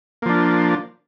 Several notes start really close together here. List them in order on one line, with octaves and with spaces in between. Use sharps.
A#3 F3 D4